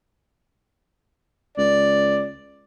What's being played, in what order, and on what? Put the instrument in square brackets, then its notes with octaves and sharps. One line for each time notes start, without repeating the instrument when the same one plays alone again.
[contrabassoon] C#2 [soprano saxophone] D5